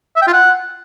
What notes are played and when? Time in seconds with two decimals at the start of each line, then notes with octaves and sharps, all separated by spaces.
0.16 E5
0.22 G5
0.27 F4
0.33 F#5